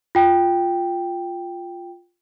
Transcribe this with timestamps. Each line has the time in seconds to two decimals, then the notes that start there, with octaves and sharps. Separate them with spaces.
0.15 F4 G5